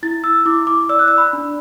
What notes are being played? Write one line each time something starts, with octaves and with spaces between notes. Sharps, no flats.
E4 A6
E6
E4 D6
D6
D5 E6
F#6
E6
B5
D4